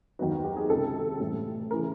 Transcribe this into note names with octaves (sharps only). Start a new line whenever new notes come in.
D#2 D#3 F#3 B3 D#4 F#4
F#4
G4
G#4
C#2 C3 F3 A4
A2 E3 G3
C#3 E3 A#4